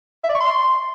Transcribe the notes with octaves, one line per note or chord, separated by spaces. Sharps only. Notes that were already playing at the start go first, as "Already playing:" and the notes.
E5
D5
C#6
C6